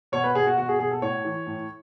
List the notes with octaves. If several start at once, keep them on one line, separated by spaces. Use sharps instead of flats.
B2 C#5
B4
B2 G#4
F#4
B2 F#4
G#4
B2 G#4
A4
A2 C#5
E3
A2